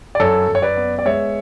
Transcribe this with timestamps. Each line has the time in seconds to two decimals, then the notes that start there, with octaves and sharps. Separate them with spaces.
0.15 D5
0.20 F#2 A4 C#5
0.48 F#2
0.55 C#5
0.62 B4 D5
0.77 B3
0.99 D5
1.05 G#3 C#5 E5